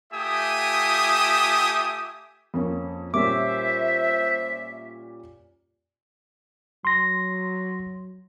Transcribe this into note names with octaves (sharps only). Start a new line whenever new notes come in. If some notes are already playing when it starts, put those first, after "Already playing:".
A3 F4 G4 E5 G#5 D#6
F2 A#3 C#4
A#2 G3 C#4 C5 E5 D6
F#3 C6 A#6